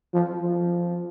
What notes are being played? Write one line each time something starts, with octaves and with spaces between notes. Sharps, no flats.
F3
F3